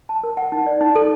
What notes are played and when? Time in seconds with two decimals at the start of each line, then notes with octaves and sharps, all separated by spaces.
0.09 A5
0.23 A#4
0.37 F#5
0.52 D#4
0.66 D5
0.81 D#4
0.95 A4